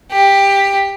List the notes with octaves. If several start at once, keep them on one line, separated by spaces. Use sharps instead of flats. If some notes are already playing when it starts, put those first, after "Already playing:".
G4